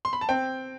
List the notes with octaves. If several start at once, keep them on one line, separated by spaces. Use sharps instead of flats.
C6
B5
A5
C4 G5